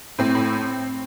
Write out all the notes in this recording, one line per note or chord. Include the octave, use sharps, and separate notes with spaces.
A2 C4
A2